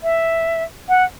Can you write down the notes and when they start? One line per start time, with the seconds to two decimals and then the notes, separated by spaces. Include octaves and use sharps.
0.03 E5
0.89 F#5